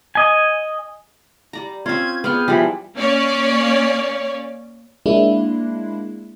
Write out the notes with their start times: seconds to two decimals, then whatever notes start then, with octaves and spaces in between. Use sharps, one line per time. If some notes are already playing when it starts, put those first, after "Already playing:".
0.15 D#5 G#5
1.53 G3 D5 A#5
1.86 C4 C#4 F4 G#6
2.24 B3 G#4 D5 G5 F6
2.48 E3 F3 G3 B5
2.96 A#3 C#4 C#5 D5
5.06 G#3 A#3 D4 E4